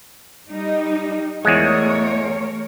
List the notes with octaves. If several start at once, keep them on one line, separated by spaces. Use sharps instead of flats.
G3 D#4
E2 G#3 A3 A#4 C#5